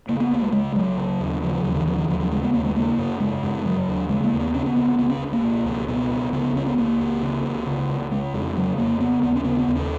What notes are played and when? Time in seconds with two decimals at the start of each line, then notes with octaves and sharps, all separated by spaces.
0.09 C#3 A#3
0.20 B3
0.31 C#2 A#3
0.42 G#3
0.52 C#3 G#3
0.75 C#2 F#3
0.97 C#3
1.20 D#2
1.42 C#3 F3
1.53 F3
1.64 D#2 F#3
1.76 D#3
1.87 C#3 F3
1.98 D#3
2.09 D#2 F3
2.20 F#3
2.32 C#3 G#3
2.43 B3
2.53 D#2 A#3
2.66 G#3
2.76 C#3 A#3
2.98 F#2
3.20 C#3 G#3
3.43 F#2
3.65 C#3 F#3
3.87 D#2
4.09 C#3 G#3
4.24 A#3
4.32 D#2
4.40 B3
4.54 C#3 C#4
4.66 B3
4.77 C#2 B3
4.88 B3
4.99 C#3 B3
5.10 C#4
5.22 C#2
5.33 A#3
5.44 B2
5.66 C#2
5.88 B2 B3
6.10 C#2
6.33 C#3 B3
6.55 C#2 C#4
6.66 B3
6.78 C#3 A#3
7.00 C#2
7.22 C#3
7.44 C#2
7.66 C#3
7.88 C#2
8.11 C#3 G#3
8.34 F2
8.56 C#3 F#3
8.78 F2 A#3
9.00 C#3 B3
9.23 D#2 B3
9.36 C#4
9.44 C#3 B3
9.60 B3
9.68 D#2
9.75 C#4